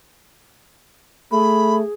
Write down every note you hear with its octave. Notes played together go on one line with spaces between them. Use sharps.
A3 G#4 B5